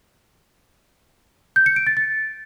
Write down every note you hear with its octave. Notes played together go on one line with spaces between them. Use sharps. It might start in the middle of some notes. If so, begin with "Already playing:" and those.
G6
C#7
D7
A6
A6